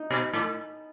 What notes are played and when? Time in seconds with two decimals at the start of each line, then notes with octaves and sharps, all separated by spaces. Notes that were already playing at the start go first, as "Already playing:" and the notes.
Already playing: D#4
0.11 B2
0.33 A2